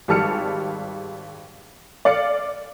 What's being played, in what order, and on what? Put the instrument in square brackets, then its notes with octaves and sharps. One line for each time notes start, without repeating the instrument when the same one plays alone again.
[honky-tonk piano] G#1 G3 G#3 A5 F6 C#7
D5 F5 A6 C#7